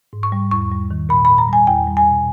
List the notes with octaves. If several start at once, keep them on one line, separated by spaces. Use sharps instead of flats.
G#2
C#6
G3
E2 C#6
G3
D#3
A#2 B5
A#2 B5
A#5
G3 G#5
E2 G5
G3
G#5
B2